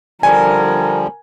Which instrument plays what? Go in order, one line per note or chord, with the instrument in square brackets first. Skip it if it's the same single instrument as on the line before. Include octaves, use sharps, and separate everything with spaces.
[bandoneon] D3 F3 G3 [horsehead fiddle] A#4 [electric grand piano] G#5